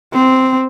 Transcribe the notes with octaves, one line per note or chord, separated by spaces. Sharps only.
C4